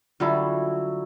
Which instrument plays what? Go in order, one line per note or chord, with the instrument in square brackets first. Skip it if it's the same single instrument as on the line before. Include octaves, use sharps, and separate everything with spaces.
[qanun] D3 G3 F4 [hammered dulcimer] F#3 E4